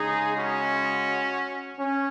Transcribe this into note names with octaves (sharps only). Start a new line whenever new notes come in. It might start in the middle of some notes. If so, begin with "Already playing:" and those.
Already playing: C#3 G#3 D#4 G#4
C#4 F#4
C#4